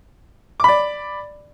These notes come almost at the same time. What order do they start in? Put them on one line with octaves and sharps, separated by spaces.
D6 B5 D5